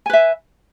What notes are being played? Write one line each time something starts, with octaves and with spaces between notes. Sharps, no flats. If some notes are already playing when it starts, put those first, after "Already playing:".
B4 E5 G#5